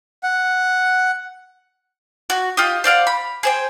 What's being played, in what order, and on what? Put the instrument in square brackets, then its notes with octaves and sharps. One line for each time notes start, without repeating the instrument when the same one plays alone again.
[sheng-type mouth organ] F#5
[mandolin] F#4
F4 G4 D#5
C5 D5 F5 F#5
B5
G#4 C5 G5